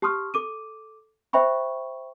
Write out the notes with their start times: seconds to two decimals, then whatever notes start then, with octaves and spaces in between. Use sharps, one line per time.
0.02 G4 A5 C6 C#6 D#6 F6
0.34 A4 D6 D#7
1.33 C5 E5 G5 B5 C#6